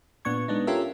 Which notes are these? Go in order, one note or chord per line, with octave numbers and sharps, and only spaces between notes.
A#2 B3 D4 C#6 G#6
G#3 B3 D4 D#4
C#4 F4 G4 A4 A#4 E5